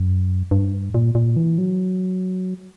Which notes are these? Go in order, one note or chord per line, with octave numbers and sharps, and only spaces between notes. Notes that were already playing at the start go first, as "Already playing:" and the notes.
Already playing: F#2
G2
A#2
A#2
E3
F#3